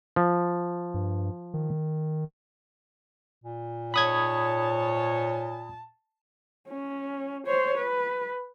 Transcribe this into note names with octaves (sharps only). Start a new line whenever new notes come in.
F3
G2
D#3
A#2
G#2 C#5 A5 B5 D#6 G#6
C#4
C5 C#5
B4